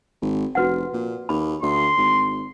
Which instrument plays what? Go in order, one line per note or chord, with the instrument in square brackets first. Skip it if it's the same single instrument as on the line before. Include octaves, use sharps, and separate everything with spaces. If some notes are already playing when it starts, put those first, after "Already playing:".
[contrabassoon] G#1
[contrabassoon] F1 [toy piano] F#4 B4 F#5
[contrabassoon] A#2
[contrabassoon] D#2 [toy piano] B5
[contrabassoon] D2 [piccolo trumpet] C6
[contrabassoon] G#1